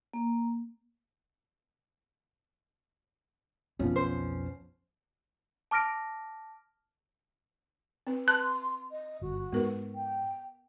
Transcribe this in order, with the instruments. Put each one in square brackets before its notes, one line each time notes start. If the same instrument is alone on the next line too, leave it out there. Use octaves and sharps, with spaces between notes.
[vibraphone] A#3
[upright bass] B1 F2 [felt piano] F3 B3 C#4
[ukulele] C5
[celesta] A5 D6 F6 A#6 D7
[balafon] C4 B4
[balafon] B4 A5 [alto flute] C6 [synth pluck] F#6
[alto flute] D#5
[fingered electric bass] G1 [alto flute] F#4
[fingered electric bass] G#2 [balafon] B3 A#4 B4
[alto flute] G5